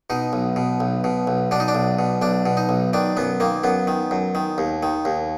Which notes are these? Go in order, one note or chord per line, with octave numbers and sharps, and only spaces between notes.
B2 D#4
B1
B2
B1
B2
B1
B2 D4
D#4
D4
B1
B2
B1 D4
B2
D#4
B1
D#3 D4
F#2 B3
D#3 A#3
F#2 B3
D#3
F#2
D#3
D#2
D#3
D#2